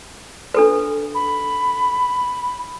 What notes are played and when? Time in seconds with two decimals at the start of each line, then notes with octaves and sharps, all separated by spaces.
0.54 D4 A4 B4
1.15 B5